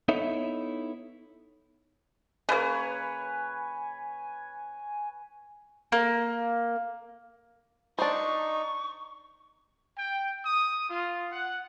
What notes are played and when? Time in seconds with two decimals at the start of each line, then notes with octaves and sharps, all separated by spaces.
0.08 B3 D#4 E4 A4 C#5 E5
2.49 C#3 A#3 B4 C#5 G#5
5.92 A#3
7.99 D4 D#4 C5 C#6
9.98 G5
10.46 D#6
10.89 F4
11.31 F#5